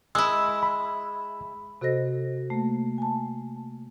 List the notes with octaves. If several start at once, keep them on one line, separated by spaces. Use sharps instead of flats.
G#3 E4 E6
B5
C3 F#4 A4 C5 D#5 A#6
A3 A#3
G#5 A5